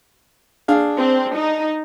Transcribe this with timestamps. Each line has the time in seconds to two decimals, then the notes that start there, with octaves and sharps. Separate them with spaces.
0.68 D4 G#4 F5
0.98 C4
1.35 D#4